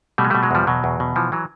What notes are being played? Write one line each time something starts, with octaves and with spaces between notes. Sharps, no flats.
B2 G3 A3
G#3
B2 G3 A3
F#3 G#3
E2 F3 G3
B2 F#3
E2
B2
E3 F3
E3 F#3